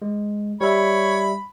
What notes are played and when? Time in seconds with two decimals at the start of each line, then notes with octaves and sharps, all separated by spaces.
0.02 G#3
0.61 G3 C#5 E5 B5